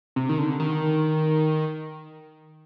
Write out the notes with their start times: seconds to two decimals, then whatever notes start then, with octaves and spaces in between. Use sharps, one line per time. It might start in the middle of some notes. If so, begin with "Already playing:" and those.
0.16 C3
0.29 D#3
0.38 D3
0.60 D#3